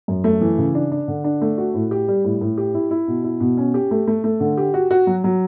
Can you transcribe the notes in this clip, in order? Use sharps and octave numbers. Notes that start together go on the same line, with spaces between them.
F#2
A3
E3
C#3
D4
D4
D3
D4
A3
F#4
A2
G4
G3
A2
A2
G4
E4
E4
B2
E4
B2
C#4
G4
A3
A3
A3
D3
G4
F#4
F#4
F#3
F#3